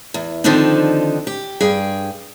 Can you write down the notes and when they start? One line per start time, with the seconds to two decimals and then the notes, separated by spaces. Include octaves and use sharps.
0.14 E2
0.44 D3 D#3 F3 C4 D4 D#4
1.27 G4
1.61 G2 G#4 G5